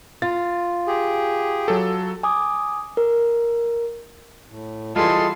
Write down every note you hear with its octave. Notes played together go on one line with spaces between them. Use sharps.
F4 A6
G4 G#4
F#3 A4
G#5 D6 D#6
A#4
A2
E3 G3 F4 G#4 A4 D#5 A5 C6